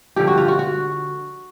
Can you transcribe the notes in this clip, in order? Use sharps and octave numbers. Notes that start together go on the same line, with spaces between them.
G2 D3 F3 G4
F#4
F4
F#4
F#4